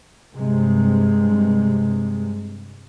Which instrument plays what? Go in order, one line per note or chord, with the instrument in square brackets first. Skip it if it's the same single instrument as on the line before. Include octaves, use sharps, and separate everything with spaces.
[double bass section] G2 C3 G#3